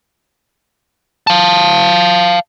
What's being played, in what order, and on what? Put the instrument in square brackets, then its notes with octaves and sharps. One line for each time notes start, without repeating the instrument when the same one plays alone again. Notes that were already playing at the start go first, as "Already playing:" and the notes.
[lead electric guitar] F5 A5